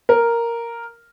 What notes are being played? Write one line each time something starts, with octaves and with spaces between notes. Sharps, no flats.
A#4